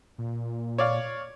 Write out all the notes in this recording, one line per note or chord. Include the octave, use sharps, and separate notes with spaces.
A#2
C#5 D5 F5